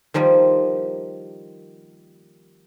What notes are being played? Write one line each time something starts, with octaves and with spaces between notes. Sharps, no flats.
D#3 F3 G3 A#3